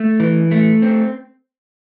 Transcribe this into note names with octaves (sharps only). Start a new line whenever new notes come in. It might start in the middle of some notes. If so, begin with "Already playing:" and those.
Already playing: A3
E3
A3
C4